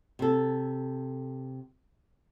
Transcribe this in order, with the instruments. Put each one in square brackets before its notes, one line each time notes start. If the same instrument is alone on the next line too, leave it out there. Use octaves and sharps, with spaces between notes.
[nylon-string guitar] C3 A4